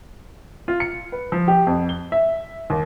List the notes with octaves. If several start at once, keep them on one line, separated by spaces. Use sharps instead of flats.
F4
C#7
B4
F3
G4
F2
G7
E5
D#2